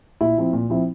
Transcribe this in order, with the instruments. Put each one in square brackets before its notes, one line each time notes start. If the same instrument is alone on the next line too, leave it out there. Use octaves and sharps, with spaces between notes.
[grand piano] A#2 E4
F3 C4 E4
A#2
F3 C4 E4